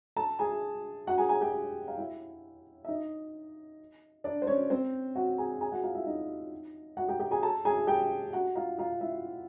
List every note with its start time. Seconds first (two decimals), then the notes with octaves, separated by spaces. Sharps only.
0.16 A4 A5
0.39 G#4 G#5
1.07 F#4 F#5
1.18 G#4 G#5
1.29 G#4 G#5
1.41 G4 G5
1.88 F5
1.97 E4 E5
2.85 E5
2.88 D#4 D#5
4.24 D4 D5
4.42 C5
4.47 C#4 C#5
4.70 C4 C5
5.15 F#4 F#5
5.38 G#4 G#5
5.61 G#4 G#5
5.72 F#4 F#5
5.83 F4 F5
5.95 E4 E5
6.06 D#4 D#5
6.97 F#4 F#5
7.09 G4 G5
7.20 G4 G5
7.31 G#4 G#5
7.43 A4 A5
7.65 G#4 G#5
7.87 G4 G5
8.33 F#4 F#5
8.56 F4 F5
8.78 F4 F5
9.01 E4 E5